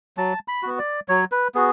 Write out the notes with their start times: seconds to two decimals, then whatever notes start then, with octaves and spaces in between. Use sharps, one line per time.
0.17 F#3 A5
0.48 B5
0.63 B3 F#4
0.79 D5
1.08 F#3 C#5
1.32 B4
1.55 B3 F#4 G#4